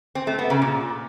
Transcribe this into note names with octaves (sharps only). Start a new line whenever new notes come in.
C4
A3
B3
C#3
A#2